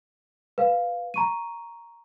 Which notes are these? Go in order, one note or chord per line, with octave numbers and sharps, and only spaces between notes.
B4 F5
A#5 C#6 D#7